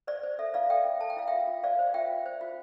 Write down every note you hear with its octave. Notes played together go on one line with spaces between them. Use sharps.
C5 D5
C5
A4 E5
E4 D5 F5
A4 E5 G5
E4
A4 A5
G5
E4 F5
F4 E5 G5
F4
C5 D5 F5
C5
F4 E5 G5
F4
C5
F4